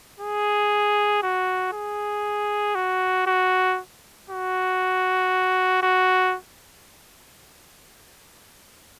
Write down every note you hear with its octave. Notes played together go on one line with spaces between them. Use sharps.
G#4
F#4
G#4
F#4
F#4
F#4
F#4